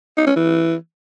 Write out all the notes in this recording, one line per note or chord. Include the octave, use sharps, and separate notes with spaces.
D#4
C#4
E3